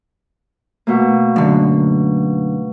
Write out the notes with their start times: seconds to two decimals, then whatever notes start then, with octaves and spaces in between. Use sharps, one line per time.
0.87 B2 A3 A#3
1.36 F#2 D3